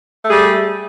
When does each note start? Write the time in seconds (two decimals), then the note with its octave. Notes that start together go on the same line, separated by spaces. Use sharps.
0.23 A3
0.28 G#4
0.32 G3